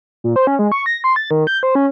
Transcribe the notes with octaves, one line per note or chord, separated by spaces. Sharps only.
A#2
C5
C#4
G#3
C#6
A#6
C6
A6
D#3
G6
C5
C#4